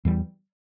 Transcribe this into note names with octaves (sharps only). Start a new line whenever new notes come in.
E2 E3 G3